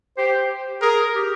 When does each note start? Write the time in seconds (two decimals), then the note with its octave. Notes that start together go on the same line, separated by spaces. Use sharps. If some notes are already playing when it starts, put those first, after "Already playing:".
0.17 G4 C5
0.82 G#4 A#4
1.15 G4